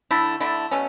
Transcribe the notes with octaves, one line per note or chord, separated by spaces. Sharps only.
D3 A3 E4
D3 A3 E4
B2 A3 C#4